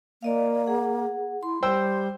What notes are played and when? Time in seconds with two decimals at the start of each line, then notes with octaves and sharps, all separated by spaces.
0.23 A#3 D5 D#5 F5
0.67 G#4 F#5
1.43 E4 C6
1.63 G3 C5 G5 E6